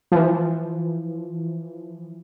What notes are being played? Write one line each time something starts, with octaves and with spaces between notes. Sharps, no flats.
E3 F3